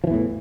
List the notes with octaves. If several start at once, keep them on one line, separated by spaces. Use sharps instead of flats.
E2 A2 E3 F3